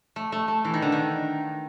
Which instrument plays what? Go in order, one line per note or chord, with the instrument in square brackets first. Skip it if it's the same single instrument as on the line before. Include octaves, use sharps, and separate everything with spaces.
[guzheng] A3
A3
A3
E3
D#3
D3
D#3